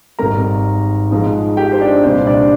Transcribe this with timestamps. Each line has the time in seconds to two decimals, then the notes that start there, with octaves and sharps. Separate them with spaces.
0.19 G#1 G#2 D#3 G3 A#4 A#5
1.11 G#2 F3 G#3 D#4
1.57 G4 G5
1.72 C5
1.81 D4 D5
2.03 C2 A#2 G3 D4 C5
2.27 D4 D5